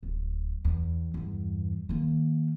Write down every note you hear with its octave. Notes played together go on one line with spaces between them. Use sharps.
D1
E2
E2 G2
D#3 A#3